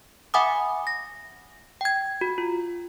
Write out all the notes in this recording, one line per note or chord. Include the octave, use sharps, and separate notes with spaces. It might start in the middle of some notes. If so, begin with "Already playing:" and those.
E5 F#5 G#5 B5 D6 D#6
A#6
G5 G#6
F#4
F4